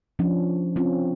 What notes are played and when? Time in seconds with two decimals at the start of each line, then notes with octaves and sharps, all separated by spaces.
0.19 F3 C#4 D4
0.76 C4 C#4 F4